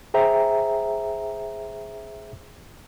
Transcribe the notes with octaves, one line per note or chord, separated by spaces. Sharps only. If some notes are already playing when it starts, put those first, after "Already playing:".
G#4 C5 E5 G5 A#5